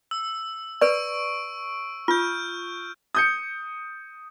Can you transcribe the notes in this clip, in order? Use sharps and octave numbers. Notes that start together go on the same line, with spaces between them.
E6
B4 D5 C#6 E6 D7
F4 F6 G6
D#6 G6 C#7